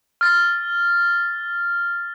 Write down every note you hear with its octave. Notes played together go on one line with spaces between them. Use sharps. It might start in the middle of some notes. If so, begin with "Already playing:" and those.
F6 A6